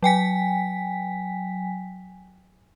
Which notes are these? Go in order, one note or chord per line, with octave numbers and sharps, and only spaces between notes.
F#3 G5 G#5 B6